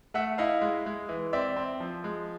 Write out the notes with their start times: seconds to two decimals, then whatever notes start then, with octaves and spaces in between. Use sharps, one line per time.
0.14 A3 E5 F#5
0.38 E4 D#5 F5
0.61 G#3
0.86 G#3
1.09 E3
1.33 C4 D5 E5
1.57 C4
1.80 F3
2.04 G#3